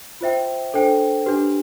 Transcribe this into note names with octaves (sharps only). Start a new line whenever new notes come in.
F4 C5 E5 G5
D4 A4 C5 G5
D4 G4 B4